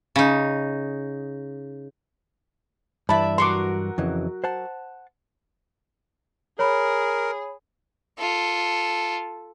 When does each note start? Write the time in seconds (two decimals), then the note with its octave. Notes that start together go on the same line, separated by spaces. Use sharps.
0.16 C#3 D#4
3.09 G2 E3 D5 E5 A5 B5
3.38 F#3 F#4 A#4 C6 D6
3.98 F2 C#3 E3
4.44 C5 F#5 A5
6.59 G#4 A#4 C#5 B5
8.19 F4 A4